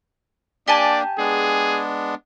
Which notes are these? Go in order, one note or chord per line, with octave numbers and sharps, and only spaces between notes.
A#3 D4 G4 D5 G#5 A5
G#3 B3 D4 G#4